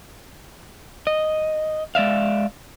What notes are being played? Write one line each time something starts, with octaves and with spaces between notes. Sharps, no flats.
D#5
G#3 D5 E5 F5